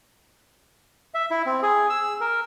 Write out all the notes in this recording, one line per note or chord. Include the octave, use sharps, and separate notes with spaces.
E5
E4
C4
G#4
E6
A#4